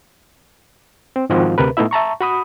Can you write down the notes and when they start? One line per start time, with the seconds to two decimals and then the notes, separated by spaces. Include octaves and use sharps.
1.16 C4
1.30 G#2 D#3 F3 C4 F4 F#4
1.58 D2 C3 A#4 B4
1.77 A2 A3 B3 D#4 E4 E5
1.91 E5 A5 A#5 C#6
2.20 F#4 B5 D#6